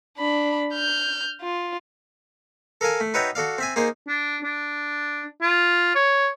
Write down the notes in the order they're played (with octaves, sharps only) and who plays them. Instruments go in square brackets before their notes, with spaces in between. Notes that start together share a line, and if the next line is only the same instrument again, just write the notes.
[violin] D4 B5
F6 G6
F4
[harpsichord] A4 A#4 F5 G#5 A5
A3
D#4 F#4 B4 C#5 E5 G5
F#4 A4 D5 F5
C4 E5 G#5
A#3 D#4 G#4 C5
[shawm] D4
D4
F4
C#5